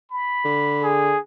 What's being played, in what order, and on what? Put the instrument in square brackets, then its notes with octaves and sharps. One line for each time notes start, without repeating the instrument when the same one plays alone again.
[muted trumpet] B5
[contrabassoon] D3
[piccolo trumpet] G#4